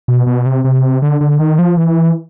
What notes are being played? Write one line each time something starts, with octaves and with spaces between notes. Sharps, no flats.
B2
B2
C3
C3
D3
D3
D#3
F3
E3